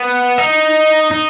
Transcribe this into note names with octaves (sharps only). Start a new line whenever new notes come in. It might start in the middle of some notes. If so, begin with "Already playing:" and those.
Already playing: B3
D#4
D#4